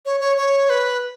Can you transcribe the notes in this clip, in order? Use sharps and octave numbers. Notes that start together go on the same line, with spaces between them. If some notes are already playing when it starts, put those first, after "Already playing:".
C#5
C#5
C#5
B4